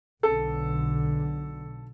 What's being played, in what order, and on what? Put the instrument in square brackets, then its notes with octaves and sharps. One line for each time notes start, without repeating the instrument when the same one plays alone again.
[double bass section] B1 D3 [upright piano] A4